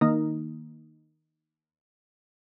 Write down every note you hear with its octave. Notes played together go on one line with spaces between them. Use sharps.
D#3 A#3 D#4